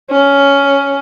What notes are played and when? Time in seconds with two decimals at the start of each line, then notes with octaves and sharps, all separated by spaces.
0.11 C#4